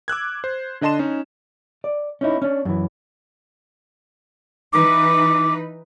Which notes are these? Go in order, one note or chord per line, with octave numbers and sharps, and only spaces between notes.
D6 E6 F#6 G#6
C5
D3 D4 D#5 A5 C6 E7
C#4 D#4
D5
C#4 D#4 E4
C#4 D4
F#2 E3
E3 D#4 B4 D6